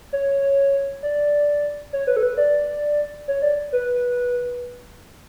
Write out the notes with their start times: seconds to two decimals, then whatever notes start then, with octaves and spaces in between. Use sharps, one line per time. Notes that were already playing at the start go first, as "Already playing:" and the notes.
0.13 C#5
1.03 D5
1.93 C#5
2.07 B4
2.16 A4
2.23 B4
2.38 D5
3.28 C#5
3.42 D5
3.73 B4